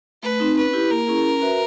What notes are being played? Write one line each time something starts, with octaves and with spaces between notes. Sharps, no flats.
A3 B4
C4 D#4
C#4 B4
E4 G4
A#3 A#4
C#4 E4 G#4
C#4
F#4 B4 E5